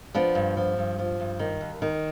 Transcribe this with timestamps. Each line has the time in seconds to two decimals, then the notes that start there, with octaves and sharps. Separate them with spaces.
0.15 F3 B3 D4
0.35 G2
0.57 F3
0.78 G2
0.99 F3
1.20 G2
1.39 D#3
1.61 D#2
1.82 D#3